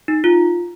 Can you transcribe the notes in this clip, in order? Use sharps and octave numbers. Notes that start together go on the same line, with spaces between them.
D#4
F4